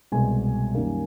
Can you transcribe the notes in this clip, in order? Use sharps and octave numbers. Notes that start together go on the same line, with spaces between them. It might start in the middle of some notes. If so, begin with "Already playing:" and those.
C2 B2 G#3 G#5
F#2 D#3 G3 A#3